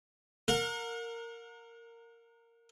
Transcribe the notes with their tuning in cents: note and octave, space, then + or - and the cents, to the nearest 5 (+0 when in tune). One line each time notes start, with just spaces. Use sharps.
A#4 -15 F#5 -45